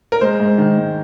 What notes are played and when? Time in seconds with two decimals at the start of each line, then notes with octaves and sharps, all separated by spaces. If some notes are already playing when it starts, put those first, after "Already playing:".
0.12 A#4
0.21 G#3 C5
0.40 G#2
0.58 D#3
0.78 G#2